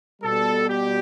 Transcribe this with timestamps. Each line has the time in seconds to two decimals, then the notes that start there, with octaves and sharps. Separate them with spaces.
0.22 B2 G3 A4
0.68 G4